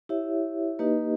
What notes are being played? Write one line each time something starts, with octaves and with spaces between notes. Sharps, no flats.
E4 G4 C#5 E5
A#3 D#4 G4 B4 D#5